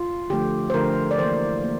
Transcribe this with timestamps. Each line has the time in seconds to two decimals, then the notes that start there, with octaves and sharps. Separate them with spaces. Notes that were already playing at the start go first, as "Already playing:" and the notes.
Already playing: F4
0.30 D3 F3 A3 G4
0.70 C5
0.74 D3 F3 A3 A#4
1.11 D5
1.19 E3 A#3 C5
1.64 A#3